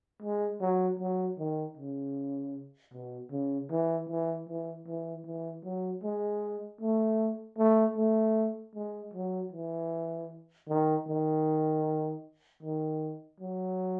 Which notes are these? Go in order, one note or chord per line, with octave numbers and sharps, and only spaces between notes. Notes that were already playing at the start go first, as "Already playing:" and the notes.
G#3
F#3
F#3
D#3
C#3
B2
C#3
E3
E3
E3
E3
E3
F#3
G#3
A3
A3
A3
G#3
F#3
E3
D#3
D#3
D#3
F#3